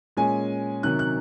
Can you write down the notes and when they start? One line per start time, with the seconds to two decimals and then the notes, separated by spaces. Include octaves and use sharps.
0.17 A#2 G#3 C#4 G#5
0.83 C3 D#3 F#3 F#6
0.99 F#6